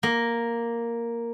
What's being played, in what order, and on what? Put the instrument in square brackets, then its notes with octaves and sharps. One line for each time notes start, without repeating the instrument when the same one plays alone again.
[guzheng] A#3